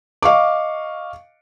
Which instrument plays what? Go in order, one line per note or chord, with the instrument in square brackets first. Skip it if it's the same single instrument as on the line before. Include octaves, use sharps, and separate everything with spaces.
[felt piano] D#5 F5 C#6 D6